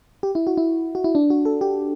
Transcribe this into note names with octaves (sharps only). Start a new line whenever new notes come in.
G4
E4
F#4
E4
F#4
E4
D4
F#4
A4
G4